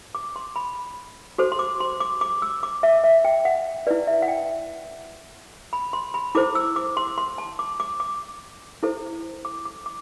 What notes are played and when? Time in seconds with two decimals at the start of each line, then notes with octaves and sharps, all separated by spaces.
0.15 D6
0.36 C6
0.56 B5
1.38 F#4 A4 C5
1.52 C6
1.59 D6
1.80 C6
2.00 D6
2.21 D6
2.42 E6
2.63 D6
2.83 E5
3.04 E5
3.25 G5
3.45 F#5
3.87 E4 B4 D5
4.07 E5
4.22 F#5
4.28 G5
5.73 B5
5.93 C6
6.14 B5
6.35 E4 A4 C5 D6
6.55 E6
6.76 D6
6.97 C6
7.18 C6
7.38 A5
7.59 D6
7.80 D6
8.00 D6
8.83 E4 A4 C5
9.45 D6
9.65 D6
9.86 D6